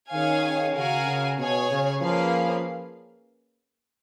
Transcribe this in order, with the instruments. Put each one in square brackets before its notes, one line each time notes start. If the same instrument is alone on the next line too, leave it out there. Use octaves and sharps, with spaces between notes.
[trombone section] D#3 [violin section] C#4 G#4 C#5 F5 G#5
[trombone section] C#3 [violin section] F#4 A#4 F5 G#5
[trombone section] C#3
[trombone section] B2 [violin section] G#4 C#5 G#5
[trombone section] C#3
[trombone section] F3 [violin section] A#3 C#4 G#4 B4 F5